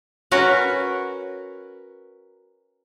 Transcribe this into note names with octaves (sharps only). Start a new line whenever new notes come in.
C#4 F#4 A#4 B4